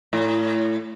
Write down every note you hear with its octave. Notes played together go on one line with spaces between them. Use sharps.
A2